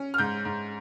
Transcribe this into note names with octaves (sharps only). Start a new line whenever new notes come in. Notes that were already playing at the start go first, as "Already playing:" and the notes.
Already playing: C#4
F6
G#2 G6
G#2